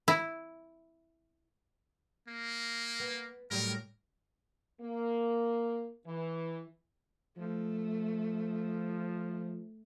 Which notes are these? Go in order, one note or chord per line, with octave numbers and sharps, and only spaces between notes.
E4
A#3
B3
A2 F#3 G3 A#4
A#3
E3
F3 A3